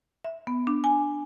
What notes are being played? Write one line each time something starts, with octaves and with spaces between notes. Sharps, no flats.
E5
B3
D4
G#5